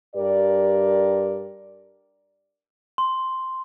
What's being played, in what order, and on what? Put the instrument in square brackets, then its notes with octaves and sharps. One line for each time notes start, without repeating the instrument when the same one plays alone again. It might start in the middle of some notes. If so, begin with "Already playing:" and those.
[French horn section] G2 G4 A#4 D5
[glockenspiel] C6